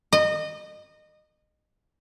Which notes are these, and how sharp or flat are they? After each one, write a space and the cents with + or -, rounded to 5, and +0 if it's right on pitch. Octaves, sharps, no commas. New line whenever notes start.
D#5 -25